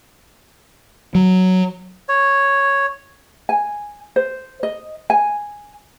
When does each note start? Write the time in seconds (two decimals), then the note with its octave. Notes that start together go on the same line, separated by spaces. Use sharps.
1.15 F#3
2.09 C#5
3.49 G#5
4.16 C5
4.63 D#5
5.10 G#5